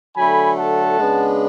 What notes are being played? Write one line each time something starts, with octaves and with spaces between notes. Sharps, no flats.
D3 F#3 A3 G#5 B5
F#5 A5
C#3 G#3 B3 D4